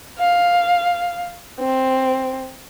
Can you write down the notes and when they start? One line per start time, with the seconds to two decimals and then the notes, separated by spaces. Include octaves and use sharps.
0.19 F5
1.60 C4